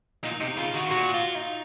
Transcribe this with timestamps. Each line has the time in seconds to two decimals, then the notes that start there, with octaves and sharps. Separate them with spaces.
0.24 A#2 D#4
0.40 C3 D#4
0.57 C#3 F4
0.74 D#3 F#4
0.90 A#2 F#4
1.13 F4
1.35 D#4